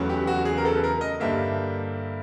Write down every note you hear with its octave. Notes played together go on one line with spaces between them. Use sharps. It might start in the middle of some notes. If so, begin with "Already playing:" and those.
Already playing: E2 C#3 F#3 A3
G4
F#4
G#4
A#4
A4
B4
A#4
D#5
G2 D3 G3 A#3 E5